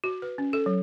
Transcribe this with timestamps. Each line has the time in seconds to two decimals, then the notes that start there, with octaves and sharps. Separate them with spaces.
0.04 F#4
0.22 B4
0.38 C#4
0.53 A4
0.66 F#3